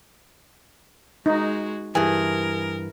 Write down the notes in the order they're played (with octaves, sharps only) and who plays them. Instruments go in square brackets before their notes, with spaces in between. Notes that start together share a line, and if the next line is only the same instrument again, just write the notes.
[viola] G#3 F#4 [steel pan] D#4
[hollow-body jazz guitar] G2 E3 [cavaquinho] G#4 [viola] A#4